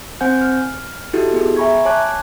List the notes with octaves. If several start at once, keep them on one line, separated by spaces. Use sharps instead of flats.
C4 C5 F#5 G#5 G6
F6
D#4 E4 F#4 G4 A4
B3 G#4
E5 G#5 A#5 B5 C#6 G#6
C#5 G#5 A5 D6 F#6 G#6